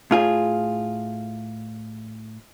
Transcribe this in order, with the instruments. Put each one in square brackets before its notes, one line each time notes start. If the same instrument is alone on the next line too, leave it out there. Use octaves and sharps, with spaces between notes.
[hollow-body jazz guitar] A2 F4 G#4